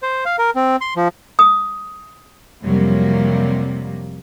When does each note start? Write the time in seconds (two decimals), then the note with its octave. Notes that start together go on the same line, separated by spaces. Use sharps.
0.03 C5
0.25 F5
0.39 A#4
0.56 C4
0.81 C6
0.96 F3
1.39 D#6
2.63 F2 C3 F#3 G3 A#3